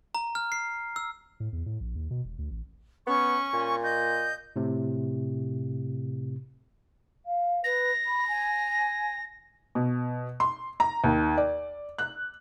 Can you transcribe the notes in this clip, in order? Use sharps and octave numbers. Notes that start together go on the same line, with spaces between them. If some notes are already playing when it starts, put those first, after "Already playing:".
A#5
F6
C7
E6
A2
E2
A2
A#1
D#2
B2
E1
D2
A1
B3 C#4 C#6
A#2
D#5 G6
A2 C3
F5
B4 A#6
B5
G#5
B2
C6
A#5
D#2
D5
F#6